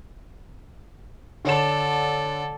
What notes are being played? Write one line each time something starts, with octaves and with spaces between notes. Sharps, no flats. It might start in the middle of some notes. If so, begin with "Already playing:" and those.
D3 A4 C#5 D5 E7